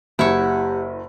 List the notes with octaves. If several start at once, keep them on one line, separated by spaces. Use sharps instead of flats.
F#1 E4 G4 C#5 F#5